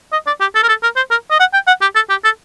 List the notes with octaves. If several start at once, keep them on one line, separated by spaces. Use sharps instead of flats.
D#5
D5
G4
A4
A#4
A4
A#4
C5
A#4
D#5
F#5
G5
F#5
G4
A4
G4
A4